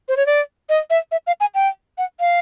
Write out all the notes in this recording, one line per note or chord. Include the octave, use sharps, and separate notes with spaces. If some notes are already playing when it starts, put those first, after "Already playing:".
C5
C#5
D5
D#5
E5
E5
F5
G#5
G5
F#5
F5